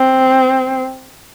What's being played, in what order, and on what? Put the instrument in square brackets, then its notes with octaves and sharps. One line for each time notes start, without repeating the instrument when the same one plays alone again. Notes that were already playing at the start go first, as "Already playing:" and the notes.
Already playing: [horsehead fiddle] C4